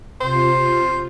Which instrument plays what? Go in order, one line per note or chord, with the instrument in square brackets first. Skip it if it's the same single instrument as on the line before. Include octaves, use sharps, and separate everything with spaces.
[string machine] C3 F4 [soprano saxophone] C5